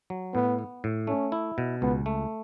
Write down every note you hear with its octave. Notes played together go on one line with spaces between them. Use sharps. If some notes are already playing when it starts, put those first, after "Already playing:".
F#3
A2 B3
B3
A2
A3 C#4
E4
B2
C#2 B3
A3